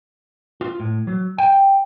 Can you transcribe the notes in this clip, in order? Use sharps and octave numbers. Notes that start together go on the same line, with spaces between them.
F4
A2
F#3
G5